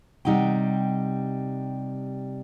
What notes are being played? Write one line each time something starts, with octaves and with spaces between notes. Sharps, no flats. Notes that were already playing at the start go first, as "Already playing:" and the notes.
C3 G3 D#4 F#5 G5